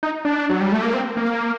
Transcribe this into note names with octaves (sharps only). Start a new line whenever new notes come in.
D#4
D4
F#3
G3
A3
A#3
C4
A#3